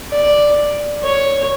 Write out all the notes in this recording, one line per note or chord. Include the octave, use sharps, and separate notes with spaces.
D5
C#5